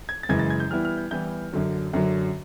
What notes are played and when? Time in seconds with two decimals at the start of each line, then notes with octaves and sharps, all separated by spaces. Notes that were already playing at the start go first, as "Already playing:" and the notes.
0.09 G#6
0.23 A6
0.29 F#2 C#3 E3 G#3 G#6
0.39 A6
0.50 G#6
0.60 G6
0.70 E3 G3 B3 E4 F6
0.85 F6
0.98 G6
1.11 E3 G3 B3 E4 G6
1.52 F#2 D3 F#3
1.93 F#2 D3 F#3